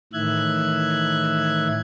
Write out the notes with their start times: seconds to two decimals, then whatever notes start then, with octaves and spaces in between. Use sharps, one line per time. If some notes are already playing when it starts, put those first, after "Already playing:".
0.13 A2 D#3 E3 E5 F#6 G#6